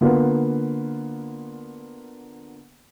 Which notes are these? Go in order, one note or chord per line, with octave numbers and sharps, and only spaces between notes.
D3 A#3 B3 F4 B4